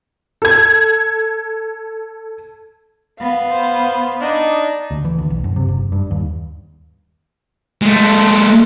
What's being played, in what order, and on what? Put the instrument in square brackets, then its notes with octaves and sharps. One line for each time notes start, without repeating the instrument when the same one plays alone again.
[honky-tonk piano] A4 G#6
[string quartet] B3 F5
[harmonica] C5
D4 D#4
[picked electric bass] D2
E3
D2
B1
F#2
C3
F#1
G2
D#2
[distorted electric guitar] G#3 A3